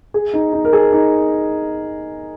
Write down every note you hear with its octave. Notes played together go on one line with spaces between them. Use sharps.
G#4
D#4
D#4
A#4
G#4
D#4